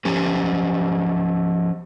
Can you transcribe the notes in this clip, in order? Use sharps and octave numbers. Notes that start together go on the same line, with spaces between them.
F3 C#4 G4